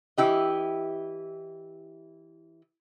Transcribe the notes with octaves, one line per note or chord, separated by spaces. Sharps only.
E3 E4 G4 D#5